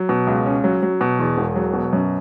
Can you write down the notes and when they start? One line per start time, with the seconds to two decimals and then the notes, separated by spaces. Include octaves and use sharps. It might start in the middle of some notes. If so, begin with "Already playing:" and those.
Already playing: F#3
0.09 B2
0.27 C#2
0.46 C#4
0.64 F#3
0.83 F#3
1.01 B2
1.19 E2
1.37 E1
1.56 F#3
1.73 B2
1.93 F#2